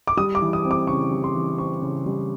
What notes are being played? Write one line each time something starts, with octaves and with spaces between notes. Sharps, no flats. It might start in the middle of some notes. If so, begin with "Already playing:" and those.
D6
G3 D#6
D6
E3
D#6
C4
D6
C#3 C#6
G3
C6
E3
C4 C#6
C#3
G3